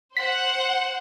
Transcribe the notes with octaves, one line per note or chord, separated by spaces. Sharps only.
C5 F#5 B6